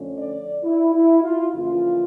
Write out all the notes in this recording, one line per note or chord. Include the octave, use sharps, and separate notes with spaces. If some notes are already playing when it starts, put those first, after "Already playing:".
Already playing: F2 D3 A3 C#4
D5
E4
E4
F4
F2 C#3 E3 A#3 C#4 F4